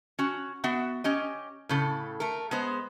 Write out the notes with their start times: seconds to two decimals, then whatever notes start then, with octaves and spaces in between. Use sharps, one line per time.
0.19 C#4 F#4
0.64 B3 F#4 E5 F#5
1.04 C#4 G4 D#5
1.69 A2 C#3 A4
2.20 A3 A#4
2.51 G#3 B3 C5